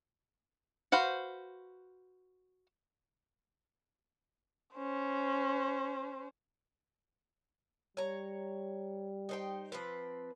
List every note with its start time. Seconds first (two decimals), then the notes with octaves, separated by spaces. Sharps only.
0.92 F#4 B4 C5 F5
4.75 C#4 C5
7.97 G3 C#5 A#5
9.29 D#4 C5 G5
9.72 F3 C4 B4